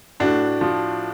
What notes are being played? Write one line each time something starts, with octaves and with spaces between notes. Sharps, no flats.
A2 D4 F#4
F3